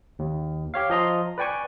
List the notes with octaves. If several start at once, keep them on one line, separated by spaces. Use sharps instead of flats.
D#2
G4 C#5 F5
F3 D#5 A#5 C6
B4 D5 G5 G#5 C#6